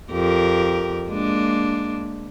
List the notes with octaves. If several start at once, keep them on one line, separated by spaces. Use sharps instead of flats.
F2 G4 A#4
G#3 A#3 D4